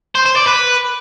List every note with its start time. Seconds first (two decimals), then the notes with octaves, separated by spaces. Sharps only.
0.15 C5
0.26 C5
0.37 D5
0.47 B4